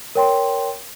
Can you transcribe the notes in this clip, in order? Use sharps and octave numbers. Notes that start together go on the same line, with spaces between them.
A#4 C#5 G5 C6